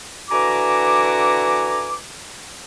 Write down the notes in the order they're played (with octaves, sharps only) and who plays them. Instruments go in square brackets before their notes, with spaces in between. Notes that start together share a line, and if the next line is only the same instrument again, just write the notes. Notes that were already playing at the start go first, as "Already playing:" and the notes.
[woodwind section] D3 E3 F#4 G#5 A#5 D6